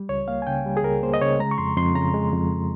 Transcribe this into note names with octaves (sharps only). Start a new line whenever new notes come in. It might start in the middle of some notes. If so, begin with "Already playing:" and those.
Already playing: G3
C#2 C#5
A#3 F5
G#5
C#3 G5
G3
G#4
C#2 A#4
A#3 C5
D#5
C#3 C#5
G#3 A#5
C#6
F2 C6
F2 C6
C#3 A#5
G#3
F2